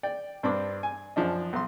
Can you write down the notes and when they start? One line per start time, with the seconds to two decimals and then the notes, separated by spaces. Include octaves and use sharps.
0.03 D5 G5
0.43 G2 C4 D4 B5 D6
0.83 G#5
1.16 F#2 F3 D4 D#5
1.53 B1 C6